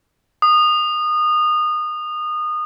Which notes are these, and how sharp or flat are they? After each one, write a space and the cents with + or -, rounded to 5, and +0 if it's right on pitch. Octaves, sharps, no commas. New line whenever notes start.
D#6 -25